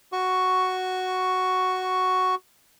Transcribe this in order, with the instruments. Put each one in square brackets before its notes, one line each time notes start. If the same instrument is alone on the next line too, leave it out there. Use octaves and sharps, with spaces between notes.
[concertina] F#4 C#6